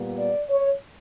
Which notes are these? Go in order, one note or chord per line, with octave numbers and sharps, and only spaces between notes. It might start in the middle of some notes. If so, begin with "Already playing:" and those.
Already playing: A#2 G3 B3
D5
C#5